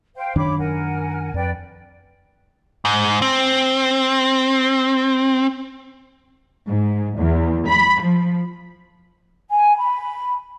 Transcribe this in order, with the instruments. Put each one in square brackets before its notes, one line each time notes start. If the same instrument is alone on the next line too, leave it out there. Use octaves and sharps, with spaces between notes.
[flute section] C5 F5 G5
[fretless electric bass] F#2 D#3 D4 [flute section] C#5 B5 D6
[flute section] A#4 F#5 G#5
[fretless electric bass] F2 [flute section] B4 D5 G5
[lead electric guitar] G#2
C4
[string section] G#2
E2
B5
F3
[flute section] G#5
B5